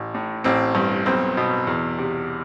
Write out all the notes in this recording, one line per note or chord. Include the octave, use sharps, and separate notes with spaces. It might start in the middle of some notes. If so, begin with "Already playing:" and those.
Already playing: A1
A2
A1 C4
G2
B1 C4
B2
E2
C3